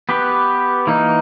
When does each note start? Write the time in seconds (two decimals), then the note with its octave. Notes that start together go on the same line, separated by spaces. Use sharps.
0.09 B3 G4 B4
0.87 E3 A#3 D#4